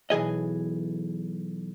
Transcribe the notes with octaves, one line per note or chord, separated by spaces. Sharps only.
B1 E3 G#4 D#5